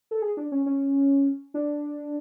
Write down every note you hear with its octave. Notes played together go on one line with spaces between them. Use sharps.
A4
G#4
D4
C#4
C#4
D4